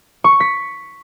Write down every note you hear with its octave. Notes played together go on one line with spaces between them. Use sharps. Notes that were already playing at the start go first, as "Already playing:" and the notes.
C#6
C#7
B6